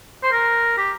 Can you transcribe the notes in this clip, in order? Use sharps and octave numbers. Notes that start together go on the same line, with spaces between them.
C5
A#4
G4